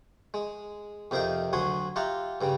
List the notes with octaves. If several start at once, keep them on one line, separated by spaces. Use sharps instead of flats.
G#3
F2 C3 D#4 A#4 F5 G5
D2 F#3 F#4 G#5 C6
F4 G4 E5 F#5 A#5
G2 C#3 G3